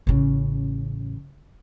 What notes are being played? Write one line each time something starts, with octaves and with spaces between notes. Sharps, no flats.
A1 C#3